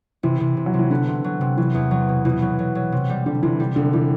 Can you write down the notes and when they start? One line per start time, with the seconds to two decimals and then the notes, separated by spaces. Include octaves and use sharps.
0.23 C3 E3
0.40 C3
0.57 C3
0.66 F#3
0.74 C3
0.79 E3
0.90 D3 B3
1.08 C3
1.24 F#3
1.41 C3
1.57 E3 F#3
1.75 E2
1.91 F#3
2.09 B2
2.25 B2 E3
2.42 F#3
2.59 F#3
2.75 F#3
2.92 C3
3.09 G3
3.26 D3 G3
3.43 C3 E3
3.60 G3
3.76 E1 D3
3.93 E3 G3